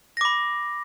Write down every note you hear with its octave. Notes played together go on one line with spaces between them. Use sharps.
B5 D6 A#6